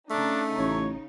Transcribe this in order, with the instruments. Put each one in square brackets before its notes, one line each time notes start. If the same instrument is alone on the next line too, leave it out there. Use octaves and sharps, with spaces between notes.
[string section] C#3 D#4 [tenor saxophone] A3 [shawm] D4
[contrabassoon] A1 [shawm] C#5